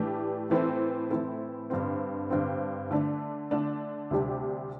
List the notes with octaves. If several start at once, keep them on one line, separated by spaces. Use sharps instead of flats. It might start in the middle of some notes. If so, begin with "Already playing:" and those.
Already playing: A2 E3 A3 D4 G4
A2 E3 C4 E4 A4
A2 E3 C4 E4 A4
G2 D3 C4
G2 D3 C4
D3 A3 D4
D3 A3 D4
D2 C3 G3 D4 G4